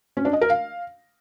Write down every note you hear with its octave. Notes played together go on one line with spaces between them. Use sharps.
C#4
D4
D#5
A#4
F5